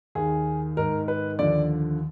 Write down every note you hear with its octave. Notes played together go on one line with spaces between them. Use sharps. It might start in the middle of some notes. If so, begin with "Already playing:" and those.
D#2 D#3 G#4
G#2 D#3 A#4
B4
D#2 D3 F3 D5